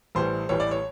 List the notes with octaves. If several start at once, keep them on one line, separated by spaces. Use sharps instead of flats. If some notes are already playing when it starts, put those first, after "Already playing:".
A1 A2 E3 G3 C5
A1 A2 E3 G3 C#5
D5
C#5